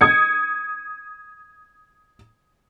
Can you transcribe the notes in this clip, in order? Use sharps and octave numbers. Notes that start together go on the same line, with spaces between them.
D#6 G#6 C#7